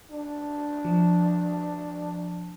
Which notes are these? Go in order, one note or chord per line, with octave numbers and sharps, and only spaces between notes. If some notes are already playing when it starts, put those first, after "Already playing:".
D4
F3